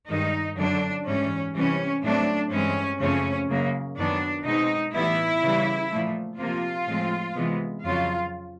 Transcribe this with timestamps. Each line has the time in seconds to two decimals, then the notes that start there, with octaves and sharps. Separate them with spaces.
0.09 G2 D#3 G#3 D#4
0.57 F#2 D3 F#3 D4
1.06 G#2 E3 G3 C#4
1.55 C3 E3 G3 C#4
2.03 A2 F#3 A3 C4 D4
2.51 G2 E3 G#3 C4 C#4
3.00 F#2 C#3 F3 A3 C4 C#4
3.49 F#2 C#3 F#3 A#3
3.97 F#2 D#3 F#3 B3 D4
4.46 B2 G#3 C4 D#4
4.94 A2 E3 G3 B3 E4
5.42 C#3 E3 G3
5.91 A#2 F3 A3
6.39 C3 F3 A#3 F4
6.88 A2 F3 G#3 C4
7.36 C3 E3 G#3 B3
7.84 F2 C#3 F#3 F4